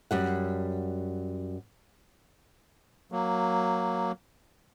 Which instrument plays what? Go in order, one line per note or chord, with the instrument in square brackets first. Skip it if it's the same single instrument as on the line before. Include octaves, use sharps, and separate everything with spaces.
[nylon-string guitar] F#2 G3 F#5
[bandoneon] F#3 A#3